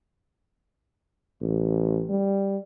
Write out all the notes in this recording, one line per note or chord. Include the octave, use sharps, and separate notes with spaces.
A1
G3